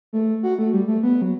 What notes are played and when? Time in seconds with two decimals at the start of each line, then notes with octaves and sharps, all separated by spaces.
0.13 A3
0.43 F#4
0.59 A3
0.73 G3
0.88 A3
1.03 B3
1.22 F#3